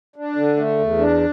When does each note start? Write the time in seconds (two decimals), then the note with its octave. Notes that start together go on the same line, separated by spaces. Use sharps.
0.16 D4
0.36 D3
0.57 A3
0.79 E2
0.98 D4